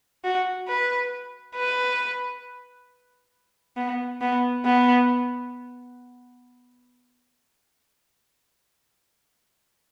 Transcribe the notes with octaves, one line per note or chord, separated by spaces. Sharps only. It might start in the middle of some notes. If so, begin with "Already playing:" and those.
F#4
B4
B4
B3
B3
B3